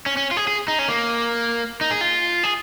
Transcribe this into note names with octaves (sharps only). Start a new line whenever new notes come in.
C#4
C#4
F4
G#4
G#4
D#4
C#4
A#3
D#4
G#4
F4
G#4